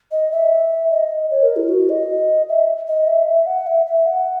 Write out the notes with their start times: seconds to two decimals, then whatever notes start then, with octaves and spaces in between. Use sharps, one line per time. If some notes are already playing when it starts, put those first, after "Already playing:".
0.11 D#5
0.32 E5
0.91 D#5
1.31 C#5
1.43 A#4
1.56 E4
1.69 F#4
1.89 D#5
2.49 E5
2.88 D#5
3.07 E5
3.27 E5
3.46 F#5
3.67 E5
3.86 E5
4.06 F#5